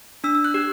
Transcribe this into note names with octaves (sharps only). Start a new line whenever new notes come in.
D4 E6
E6
F#6
G4